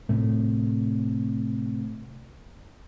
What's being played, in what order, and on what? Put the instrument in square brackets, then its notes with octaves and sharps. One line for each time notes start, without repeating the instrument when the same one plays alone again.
[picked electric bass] A2 C3 A3